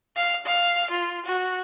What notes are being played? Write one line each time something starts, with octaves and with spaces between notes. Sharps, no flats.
F5
F5
F4
F#4